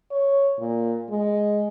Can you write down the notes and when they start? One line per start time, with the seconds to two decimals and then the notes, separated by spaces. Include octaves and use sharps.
0.11 C#5
0.59 A#2
1.10 G#3